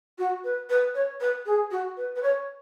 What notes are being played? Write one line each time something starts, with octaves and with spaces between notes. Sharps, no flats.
F#4
B4
B4
C#5
B4
G#4
F#4
B4
B4
C#5